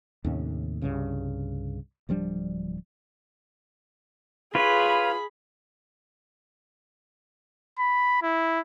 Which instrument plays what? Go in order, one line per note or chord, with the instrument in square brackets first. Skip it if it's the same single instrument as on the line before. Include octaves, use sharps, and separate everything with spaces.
[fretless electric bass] D#2 A2 C3 C#4
C2 G2 C#3
D1 F3 G3 D4
[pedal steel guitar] F4 B4 C#5 [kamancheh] G#4 B5
[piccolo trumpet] B5
E4